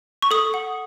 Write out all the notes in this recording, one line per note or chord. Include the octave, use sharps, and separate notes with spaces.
C#6
A4 D#6
F#5